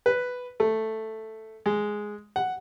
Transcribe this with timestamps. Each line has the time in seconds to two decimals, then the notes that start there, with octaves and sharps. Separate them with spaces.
0.06 B4
0.60 A3
1.66 G#3
2.36 F#5